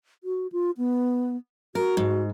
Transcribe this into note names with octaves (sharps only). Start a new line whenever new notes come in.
F#4
F4
B3
F#4 A#4
G#2